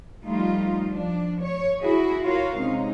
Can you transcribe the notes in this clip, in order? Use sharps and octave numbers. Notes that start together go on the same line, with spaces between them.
F3 G3 A3 D#4 F4
F3 D4
C#5
E4 F#4 G#4
F4 F#4 A#4 C#5 F5
C3 G#3 C#4 D#4